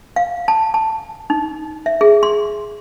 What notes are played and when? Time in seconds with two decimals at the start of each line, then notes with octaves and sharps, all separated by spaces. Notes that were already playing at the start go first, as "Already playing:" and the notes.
0.16 F5
0.48 A5
0.74 A5
1.30 D#4
1.86 E5
2.01 G#4
2.23 C6